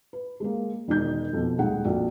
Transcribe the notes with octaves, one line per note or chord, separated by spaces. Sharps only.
B4
G#3 A#3
E1 D#3 D#4 G6
F2 B2
D#1 G#3 D#4 F#5 G5
A#1 F2 F#4